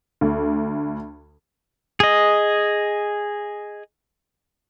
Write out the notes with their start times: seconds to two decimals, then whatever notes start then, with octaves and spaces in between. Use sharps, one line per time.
0.21 D2
2.00 G#4 D#5